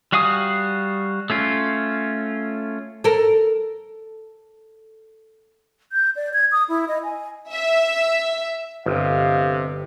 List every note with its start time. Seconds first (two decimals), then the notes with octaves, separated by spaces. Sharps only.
0.12 G3 F#4 F5 G#5 D#6
1.30 A3 C#4 F4
3.04 A4 A#4
5.92 G6
6.16 D5
6.34 G#6
6.52 D#6
6.69 E4
6.88 D#5
7.04 G#5
7.52 E5
8.86 G1 C3 D#5 F5